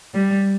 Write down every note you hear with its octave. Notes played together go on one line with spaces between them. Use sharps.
G3